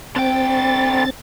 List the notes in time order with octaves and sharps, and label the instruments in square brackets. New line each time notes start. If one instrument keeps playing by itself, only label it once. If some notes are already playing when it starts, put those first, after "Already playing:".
[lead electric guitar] D3 G5 [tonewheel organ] C4 A6